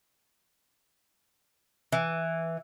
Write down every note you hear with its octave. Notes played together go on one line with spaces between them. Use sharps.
E3